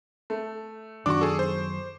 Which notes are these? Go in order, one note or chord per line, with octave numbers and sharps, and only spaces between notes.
A3
F#2 D#3 F#3 D4 F#4 C#6 D6
G#4 A4
C5